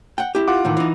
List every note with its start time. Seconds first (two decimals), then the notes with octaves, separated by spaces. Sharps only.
0.18 F#5 G5
0.35 E4 G4
0.48 F4 F#5 D6
0.65 A2 D#3 E3
0.77 E3 D#4